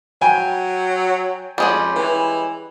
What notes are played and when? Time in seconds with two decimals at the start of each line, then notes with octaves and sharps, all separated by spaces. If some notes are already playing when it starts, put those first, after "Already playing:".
0.22 F#3 G5 G#5
1.58 F2 G3 G#3 C#4
1.96 E3